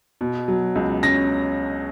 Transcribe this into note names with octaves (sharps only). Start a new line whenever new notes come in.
B2
F#3
C#2
C#4 A#6